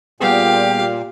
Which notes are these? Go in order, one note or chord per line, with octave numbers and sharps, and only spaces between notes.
A#2 G3 B3 G4 G#4 F5 G5